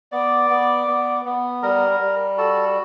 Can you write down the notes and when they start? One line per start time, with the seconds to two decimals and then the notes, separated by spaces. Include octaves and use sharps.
0.12 B3 D5 D6
0.50 B3
0.87 B3
1.25 B3
1.63 G3 A#4 A#5
2.00 G3
2.38 F#4 A4 A5